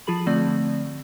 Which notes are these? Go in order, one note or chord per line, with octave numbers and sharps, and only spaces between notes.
F3 F4 G#4 B5 F#7
D3 F3 A3 C4 D5